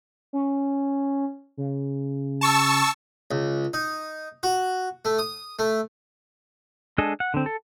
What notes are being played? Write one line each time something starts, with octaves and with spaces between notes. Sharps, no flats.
C#4
C#3
A5 C#6 E6
C#2
D#4
F#4
A3
D#6
A3
G#3 D4 G#4 A4 D#5
F#5
D3 C4
A4